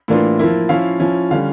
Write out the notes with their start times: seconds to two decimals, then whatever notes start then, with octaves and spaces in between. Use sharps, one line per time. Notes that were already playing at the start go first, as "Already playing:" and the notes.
0.08 A2 E3 A#3 D4 F4
0.39 F3 A#3 E4
0.69 F3 C#4 E4 F5
1.00 F3 C#4 E4
1.31 D3 G3 C#4 F5